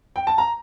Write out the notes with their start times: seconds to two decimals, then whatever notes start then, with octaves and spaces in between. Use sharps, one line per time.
0.16 G5
0.27 A5
0.38 A#5